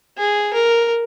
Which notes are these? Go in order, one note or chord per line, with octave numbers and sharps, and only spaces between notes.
G#4
A#4